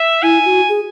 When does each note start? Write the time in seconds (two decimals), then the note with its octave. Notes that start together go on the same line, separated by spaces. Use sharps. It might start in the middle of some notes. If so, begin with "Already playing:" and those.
Already playing: E5
0.23 E4 G#5
0.45 F#4
0.69 G#4